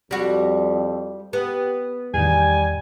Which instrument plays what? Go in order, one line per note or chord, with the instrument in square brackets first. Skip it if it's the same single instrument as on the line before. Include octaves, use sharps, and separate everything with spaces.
[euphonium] F2 [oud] G3 F#4 G4
[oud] B3 [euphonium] G4
[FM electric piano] E2 A2 D#3 [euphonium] G3 [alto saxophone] G#5